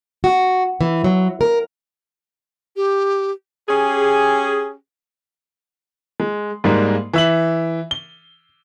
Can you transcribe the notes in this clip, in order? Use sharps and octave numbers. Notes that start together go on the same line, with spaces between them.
F#4
E3
F#3
A#4
G4
C#4 G4 G#4
G#3
G#2 G3 G#3 A#3
E3 E5 F#7
G7